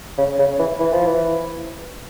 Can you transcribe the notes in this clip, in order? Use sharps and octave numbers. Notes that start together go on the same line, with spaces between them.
C#3
C#3
E3
E3
F3
E3